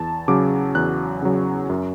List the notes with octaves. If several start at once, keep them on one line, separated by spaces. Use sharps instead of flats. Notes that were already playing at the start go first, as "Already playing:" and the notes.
Already playing: E2 A5
C#3 F#3 D6
E2 F#6
C#3 F#3
F#2